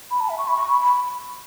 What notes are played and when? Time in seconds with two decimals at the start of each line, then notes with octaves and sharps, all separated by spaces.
0.11 B5
0.20 A5
0.29 E5
0.38 C#6
0.48 B5
0.57 C#6
0.69 B5
0.81 B5